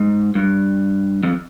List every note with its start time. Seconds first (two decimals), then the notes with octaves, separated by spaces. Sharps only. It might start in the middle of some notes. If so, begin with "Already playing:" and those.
Already playing: G#2
0.35 G2
1.23 F2